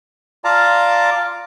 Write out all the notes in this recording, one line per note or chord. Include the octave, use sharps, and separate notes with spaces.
F4 D5 F5 A5 A#5 D6